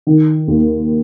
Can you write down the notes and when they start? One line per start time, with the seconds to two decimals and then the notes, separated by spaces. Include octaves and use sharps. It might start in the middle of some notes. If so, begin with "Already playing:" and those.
0.07 D#3
0.48 D#2